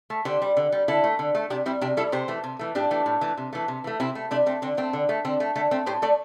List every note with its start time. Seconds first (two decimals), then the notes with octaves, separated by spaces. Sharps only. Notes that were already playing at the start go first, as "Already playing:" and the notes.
0.10 A3
0.25 D3 G4 C5
0.42 G3
0.57 D3
0.72 G3
0.88 D3 E4 A4
1.04 A3
1.19 D3
1.35 A3
1.50 C3 D4 G4
1.66 G3 C4 E4
1.81 C3 D4 G4
1.97 G3 E4 A4
2.12 C3 G4 C5
2.28 E3 A3
2.44 C3
2.59 E3 A3
2.75 A2 D4 G4
2.91 E3 A3
3.06 A2
3.21 E3 A3
3.37 C3
3.53 E3 A3
3.68 C3
3.84 E3 A3
4.00 C3 C4 E4
4.15 A3
4.31 C3 A3 D4
4.46 A3 C4
4.62 D3 C4
4.77 A3 C4
4.93 D3
5.09 A3
5.25 D3 C4
5.40 A3
5.55 D3 A3
5.71 A3 C4
5.86 A2 G4 C5
6.02 A3 A4 D5